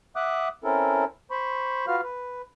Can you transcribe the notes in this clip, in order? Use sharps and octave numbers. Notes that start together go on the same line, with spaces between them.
E5 F#5 D6 D#6 F#6
C4 C#4 E4 A4 A#4
C5 B5 C#6
F4 F#4 B4 F5 F6
B4